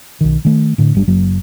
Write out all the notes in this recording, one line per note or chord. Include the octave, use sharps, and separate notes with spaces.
B1 D#3
D#3 A3
A2 D3
G1 G3 D4
F#1 F#3 A#3